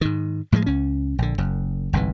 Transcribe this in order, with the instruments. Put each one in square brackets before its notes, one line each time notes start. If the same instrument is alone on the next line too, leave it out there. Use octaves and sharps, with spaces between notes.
[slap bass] G#2 D#3
A2 F3 F#3 G#3
C#2 C#4
A#1 D3
F#1 F#2
G1 C2 G#2 E3